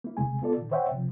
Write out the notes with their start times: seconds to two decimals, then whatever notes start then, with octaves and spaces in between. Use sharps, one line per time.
0.04 A#3 E4
0.17 D2 C3 G#3 G#5
0.42 B3 F4 A4 D5
0.57 A#2 D#3
0.72 C5 C#5 E5 F#5 G5
0.92 C3 F3